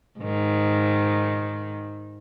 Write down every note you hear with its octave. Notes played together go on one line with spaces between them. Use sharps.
G#2 D#3